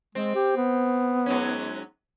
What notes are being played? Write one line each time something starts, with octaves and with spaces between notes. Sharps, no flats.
G#3 C4
G4
B3
G#2 F#3 C#4